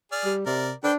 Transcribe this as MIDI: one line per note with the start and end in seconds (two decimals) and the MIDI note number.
0.12 0.33 68
0.12 0.33 74
0.12 0.33 89
0.25 0.42 55
0.47 0.73 48
0.47 0.71 70
0.47 0.71 74
0.84 0.97 62
0.84 0.92 71
0.84 0.92 72
0.84 0.92 79